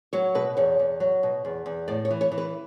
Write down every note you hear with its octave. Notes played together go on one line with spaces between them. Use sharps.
F#3 C#5
B2 B4
E2 C#5
E2
F#3
B2
E2
E2
A2 D5
C#5
E3
C#5
E3
B4